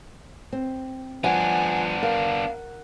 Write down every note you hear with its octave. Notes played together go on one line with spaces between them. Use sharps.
C4
F3 B3 D4 F#5 G#5
A#4 F5